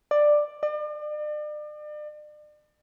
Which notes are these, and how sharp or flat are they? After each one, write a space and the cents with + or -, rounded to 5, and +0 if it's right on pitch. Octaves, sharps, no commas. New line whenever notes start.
D5 +10
D5 +40